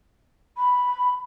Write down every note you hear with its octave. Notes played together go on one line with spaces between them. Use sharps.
B5